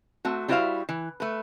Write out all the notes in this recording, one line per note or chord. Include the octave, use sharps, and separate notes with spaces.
A3 C4 F#4
G3 E4 F#4 C5 E5 F5
E3
A3 B4